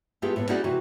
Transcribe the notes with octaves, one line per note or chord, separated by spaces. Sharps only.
A3 B3 E4 F4 G4 G#4
A2 B3
C#4 D#4 E4 F#4 G#4 D5
C3 E3 F#4